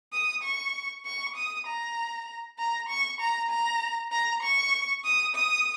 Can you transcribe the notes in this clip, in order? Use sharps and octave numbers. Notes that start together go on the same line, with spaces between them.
D#6
C#6
C#6
D#6
A#5
A#5
C#6
A#5
A#5
A#5
C#6
D#6
D#6